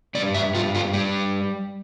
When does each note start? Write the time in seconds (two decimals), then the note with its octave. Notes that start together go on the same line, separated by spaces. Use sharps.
0.15 G2 D5
0.34 E5
0.54 G2 F4
0.75 F4
0.93 G3